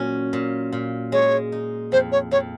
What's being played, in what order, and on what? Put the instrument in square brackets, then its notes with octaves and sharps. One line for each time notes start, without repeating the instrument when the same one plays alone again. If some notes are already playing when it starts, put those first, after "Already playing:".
Already playing: [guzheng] A#2 F#3 C#4
A#2
A#2
[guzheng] G#3 [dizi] C#5
[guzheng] D#4
[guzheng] F2 [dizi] C5
[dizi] C#5
[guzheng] F2 [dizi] C#5